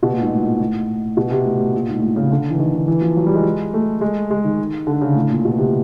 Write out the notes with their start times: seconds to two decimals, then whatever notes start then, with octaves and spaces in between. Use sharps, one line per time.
0.03 B2
0.13 A#2
0.21 G#2
0.31 A2
0.45 A#2
0.60 A2
1.17 B2
1.31 C3
1.45 A2
1.60 A2
1.74 A#2
1.89 G#2
1.99 A2
2.02 A#2
2.16 C#3
2.31 D3
2.50 E3
2.59 D#3
2.74 D#3
2.88 E3
3.02 F3
3.17 F#3
3.26 G3
3.35 G#3
3.74 A3
4.01 G#3
4.31 G#3
4.44 D#3
4.87 D3
5.01 C#3
5.15 A2
5.30 A#2
5.45 B2
5.58 C3